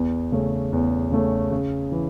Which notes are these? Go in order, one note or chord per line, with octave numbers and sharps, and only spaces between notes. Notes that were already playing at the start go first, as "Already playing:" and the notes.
Already playing: E2
C#3 A3 C#4
E2
C#3 A3 C#4
C#3
E3